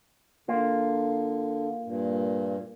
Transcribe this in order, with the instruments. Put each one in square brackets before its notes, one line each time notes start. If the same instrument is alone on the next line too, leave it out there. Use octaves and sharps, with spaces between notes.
[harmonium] D3 [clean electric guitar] A#3 F4
[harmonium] G2 A#2